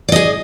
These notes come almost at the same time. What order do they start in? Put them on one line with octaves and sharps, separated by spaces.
D5 D#5 G#4